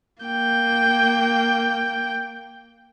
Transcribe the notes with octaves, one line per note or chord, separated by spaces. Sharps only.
A#3 G5